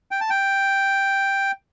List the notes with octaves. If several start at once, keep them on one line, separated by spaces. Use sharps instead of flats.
G5
A5
G5